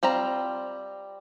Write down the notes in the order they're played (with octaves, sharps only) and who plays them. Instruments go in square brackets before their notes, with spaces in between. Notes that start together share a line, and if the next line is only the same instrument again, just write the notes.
[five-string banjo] G3 C4 F4 A#5